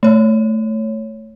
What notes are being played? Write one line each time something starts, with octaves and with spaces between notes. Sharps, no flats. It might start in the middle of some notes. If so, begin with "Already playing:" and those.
A3 C#5